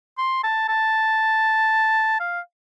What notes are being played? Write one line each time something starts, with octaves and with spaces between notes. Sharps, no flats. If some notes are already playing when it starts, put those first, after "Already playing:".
C6
A5
A5
F5